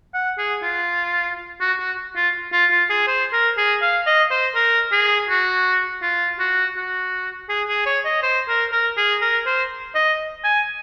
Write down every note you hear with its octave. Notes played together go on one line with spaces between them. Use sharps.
F#5
G#4
F4
F#4
F#4
F4
F4
F4
G#4
C5
A#4
G#4
F5
D#5
C5
A#4
G#4
F#4
F4
F#4
F#4
G#4
G#4
C#5
D#5
C5
A#4
A#4
G#4
A#4
C5
D#5
G#5